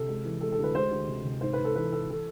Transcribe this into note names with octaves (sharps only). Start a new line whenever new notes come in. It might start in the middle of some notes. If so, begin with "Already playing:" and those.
Already playing: C3 A4
G#3
E3
G#3 A4
A4
D2
B4
G#3 C5
D2
C3
C3
G#2 C5
G#2 B4
A4
E3 B4
G#2 A4
E3 A4